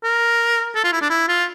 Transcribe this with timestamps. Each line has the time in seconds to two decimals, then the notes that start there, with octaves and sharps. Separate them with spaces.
0.04 A#4
0.75 A4
0.84 F4
0.93 E4
1.01 D4
1.10 E4
1.28 F4